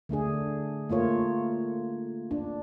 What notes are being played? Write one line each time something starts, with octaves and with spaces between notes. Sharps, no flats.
D3 A3 D4 G#4
A3 A#3 F4 C#5
D4